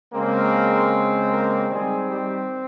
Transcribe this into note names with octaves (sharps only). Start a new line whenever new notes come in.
C#3 G#3 A#3 C4 A#4
A#3 A#4
D#3 G3 G#3 C4 G#4
G3 G4